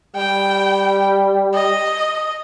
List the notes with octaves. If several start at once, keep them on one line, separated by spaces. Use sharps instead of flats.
G3 G5
D#5